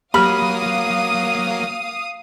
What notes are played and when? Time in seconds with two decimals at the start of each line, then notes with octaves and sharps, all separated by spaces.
0.14 F#3 A#3 G4 F5 B5 D#6 F6